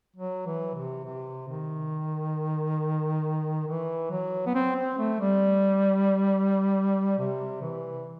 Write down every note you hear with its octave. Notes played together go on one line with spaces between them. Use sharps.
F#3
E3
C3
C3
D#3
E3
F#3
B3
C4
C4
A3
G3
C3
E3